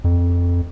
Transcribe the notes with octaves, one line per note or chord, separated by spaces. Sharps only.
F2